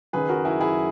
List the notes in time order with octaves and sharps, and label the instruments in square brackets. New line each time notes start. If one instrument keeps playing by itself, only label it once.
[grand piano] F#1 F#2 D#3 G#4 B4
F#4 A#4
E4 G#4
E4 G#4